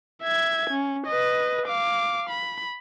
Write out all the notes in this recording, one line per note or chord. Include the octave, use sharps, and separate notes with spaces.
E5 G#6
C#4
B4 D#5
F5 D6
B5